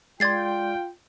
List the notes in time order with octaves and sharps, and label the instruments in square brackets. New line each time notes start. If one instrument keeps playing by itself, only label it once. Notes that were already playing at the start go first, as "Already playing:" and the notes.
[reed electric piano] G#3 D5 C6 [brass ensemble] F4 G5 [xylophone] G#6 A6 C7